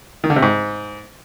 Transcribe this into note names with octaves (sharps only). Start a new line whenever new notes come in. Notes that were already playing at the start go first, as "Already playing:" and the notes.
D#3
D3
C3
G#2